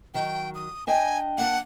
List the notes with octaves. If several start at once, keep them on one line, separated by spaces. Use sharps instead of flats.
D#3 F#3 G5
D#6
D4 D#5 G5 G#5
A#3 D4 F#5